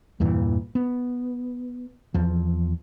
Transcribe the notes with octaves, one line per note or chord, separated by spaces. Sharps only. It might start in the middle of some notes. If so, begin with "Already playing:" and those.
E2 G2 A#2 E3
B3
E2 F3